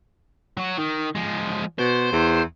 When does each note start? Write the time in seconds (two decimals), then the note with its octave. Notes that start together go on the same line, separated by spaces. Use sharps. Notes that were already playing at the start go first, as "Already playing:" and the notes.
0.57 F#3 F#4
0.78 D#3
1.15 F3 G#3
1.79 B2 C5
2.12 E2